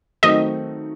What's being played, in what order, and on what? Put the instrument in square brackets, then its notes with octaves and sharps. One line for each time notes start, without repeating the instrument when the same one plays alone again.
[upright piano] D#3 F#3 A3 C4 D#4 [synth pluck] D#5